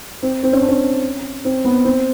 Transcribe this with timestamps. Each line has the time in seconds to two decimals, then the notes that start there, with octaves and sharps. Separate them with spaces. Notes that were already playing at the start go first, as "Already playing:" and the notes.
0.23 C4
0.43 C4
0.53 C#4
0.61 D4
0.69 C#4
1.45 C4
1.65 B3
1.85 C4